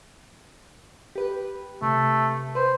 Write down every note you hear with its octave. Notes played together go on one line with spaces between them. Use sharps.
G4 B4
C3 A3
B4 C5